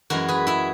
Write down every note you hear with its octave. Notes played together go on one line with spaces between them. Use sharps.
F#2 E3 G#3 F#4 A#4
G#4 B4
E4 G#4